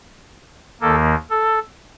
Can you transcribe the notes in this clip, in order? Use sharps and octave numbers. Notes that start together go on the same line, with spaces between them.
D#2 D#3 A#3 A4
A4